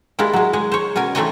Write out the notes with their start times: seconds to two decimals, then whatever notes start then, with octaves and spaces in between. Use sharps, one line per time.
0.19 G3 G#3 A#3 E4
0.33 F#3 G#3
0.53 G#3 G#4
0.72 C5 C#5
0.96 B2 C#4 A#4 G#5
1.15 E3 A3 C4 D#4 C#5 D#5